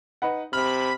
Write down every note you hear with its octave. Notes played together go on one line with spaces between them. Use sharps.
D#4 B4 F#5
C3 B5 F6